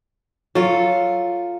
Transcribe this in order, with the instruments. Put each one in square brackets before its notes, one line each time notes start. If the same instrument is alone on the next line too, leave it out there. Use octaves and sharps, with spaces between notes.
[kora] F#3 [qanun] F4 A4